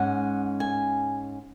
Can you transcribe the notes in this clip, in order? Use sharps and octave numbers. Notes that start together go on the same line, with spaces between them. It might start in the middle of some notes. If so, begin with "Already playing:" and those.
Already playing: G#2 G#3 C#4 F#5
G#5